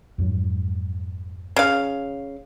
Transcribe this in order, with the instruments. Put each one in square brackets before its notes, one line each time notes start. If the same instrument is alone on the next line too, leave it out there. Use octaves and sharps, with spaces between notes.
[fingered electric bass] F2 G#2 F#3
[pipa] C#3 F5